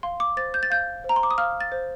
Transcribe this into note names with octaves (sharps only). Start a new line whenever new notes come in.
F5 C6
D6
C5 A6
G6
A6
F5 G6
C5
A#5
C6
D6
D#6
F5 F6
A6
C5